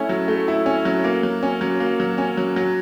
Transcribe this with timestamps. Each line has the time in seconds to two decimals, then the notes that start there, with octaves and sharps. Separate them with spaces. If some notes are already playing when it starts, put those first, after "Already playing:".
Already playing: A3 C#4 E4
0.09 F#3
0.28 A3
0.48 E4
0.66 C#4
0.85 F#3
1.04 A#3
1.23 F#3
1.43 C#4
1.61 F#3
1.80 A#3
2.00 F#3
2.18 C#4
2.37 F#3
2.56 F#3